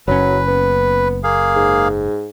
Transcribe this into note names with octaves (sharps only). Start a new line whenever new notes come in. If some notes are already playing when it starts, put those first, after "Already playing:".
F#1 F#3 C#4 B4
B3
A#3 G#4 F5
G#2